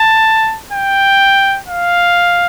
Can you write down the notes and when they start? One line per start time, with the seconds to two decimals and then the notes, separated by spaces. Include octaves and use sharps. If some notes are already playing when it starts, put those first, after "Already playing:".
Already playing: A5
0.72 G5
1.68 F5